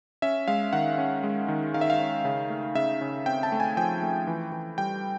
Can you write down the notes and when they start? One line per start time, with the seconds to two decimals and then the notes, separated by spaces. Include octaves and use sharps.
0.22 C#4 E5
0.48 G#3 F5
0.73 D#3 F#5
0.98 C#4
1.23 G#3
1.48 D#3
1.74 D#3 F5
1.81 E5
1.90 F5
1.99 C#4
2.25 C#3
2.50 A3
2.75 C#3 E5
3.01 C#3
3.26 C4 G5
3.43 A5
3.52 A3
3.60 G#5
3.77 F3 G5
4.02 A3
4.27 E3
4.52 E3
4.78 G3 G5